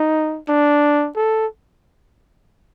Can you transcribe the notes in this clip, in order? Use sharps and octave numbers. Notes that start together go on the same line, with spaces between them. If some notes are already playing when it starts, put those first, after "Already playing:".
Already playing: D#4
D4
A4